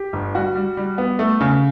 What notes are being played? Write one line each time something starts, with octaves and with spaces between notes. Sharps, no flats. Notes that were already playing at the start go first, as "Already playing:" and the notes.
Already playing: G4
G1
G3 F#4
G3
G3
B3
A3
C#3